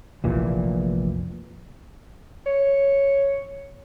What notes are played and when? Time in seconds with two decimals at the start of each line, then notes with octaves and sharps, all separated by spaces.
0.24 F1 A#1 A#2 E3
2.46 C#5